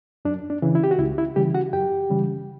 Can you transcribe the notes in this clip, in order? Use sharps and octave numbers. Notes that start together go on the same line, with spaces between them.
F#2 D4
D4
C#3 E3
E4
G4
F#4
C#2 E4
E4
C#3 E3 G3 G4
F#4 F#5
F#2 G4 G5
C#3 E3 G3